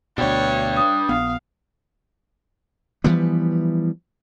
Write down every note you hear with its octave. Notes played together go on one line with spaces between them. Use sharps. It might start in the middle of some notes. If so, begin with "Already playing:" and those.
D2 B2 D4 G4 C#5
D#6
A#1 B3 F5
E3 F3 G3 B3